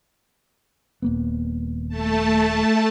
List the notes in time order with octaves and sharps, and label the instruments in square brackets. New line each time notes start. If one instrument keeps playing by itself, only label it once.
[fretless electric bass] D#1 A#3 B3
[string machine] A3 A5